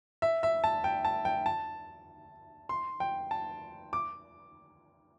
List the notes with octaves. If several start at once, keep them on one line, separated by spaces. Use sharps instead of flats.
E5
E5
A5
G5
A5
G5
A5
C6
G5
A5
D6